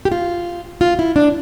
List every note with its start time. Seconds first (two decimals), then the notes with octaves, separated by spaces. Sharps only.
0.05 G4
0.12 F4
0.81 F4
0.99 E4
1.16 D4